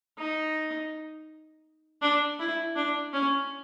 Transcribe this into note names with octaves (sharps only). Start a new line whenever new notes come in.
D#4
D4
E4
D4
C#4